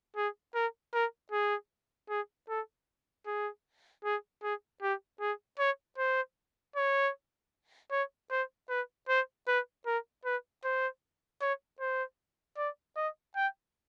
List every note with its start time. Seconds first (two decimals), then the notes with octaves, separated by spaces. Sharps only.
0.16 G#4
0.55 A#4
0.94 A#4
1.32 G#4
2.09 G#4
2.49 A4
3.26 G#4
4.04 G#4
4.43 G#4
4.82 G4
5.21 G#4
5.59 C#5
5.98 C5
6.76 C#5
7.91 C#5
8.31 C5
8.69 B4
9.09 C5
9.48 B4
9.86 A#4
10.25 B4
10.64 C5
11.41 C#5
11.80 C5
12.57 D5
12.97 D#5
13.36 G5